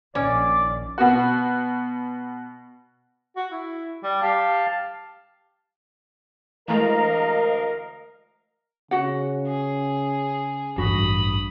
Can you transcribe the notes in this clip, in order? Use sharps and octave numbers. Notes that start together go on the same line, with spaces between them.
A#1 D#3 C#4 D5 D6
B2 F#4
F#4
E4
G3
G4 F5 A5
D2 E3 G#3 A3 A#4 D#5 F5 A#5
C#3 F#4 F#5
G#4
A1 G2 F#4 B5 D#6